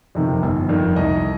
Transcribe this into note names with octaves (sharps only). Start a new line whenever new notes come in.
F2 C3 D#3
G1
F2 D#3
C2 D#5